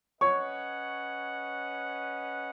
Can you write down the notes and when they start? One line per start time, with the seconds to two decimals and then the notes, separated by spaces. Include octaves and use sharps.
0.21 C#4 B4 C#5 D#5 F#5 C#6